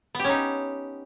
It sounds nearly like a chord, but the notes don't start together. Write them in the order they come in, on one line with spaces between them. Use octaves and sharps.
B3 G4 C#4 D#4